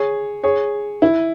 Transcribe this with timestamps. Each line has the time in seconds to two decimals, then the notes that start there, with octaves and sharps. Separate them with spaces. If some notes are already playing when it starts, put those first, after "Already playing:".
Already playing: G#4 C#5
0.44 G#4 C#5
1.02 E4